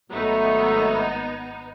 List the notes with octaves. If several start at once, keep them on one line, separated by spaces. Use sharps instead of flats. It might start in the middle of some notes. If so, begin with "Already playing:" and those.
G#1 F#3 A3 B3 D#4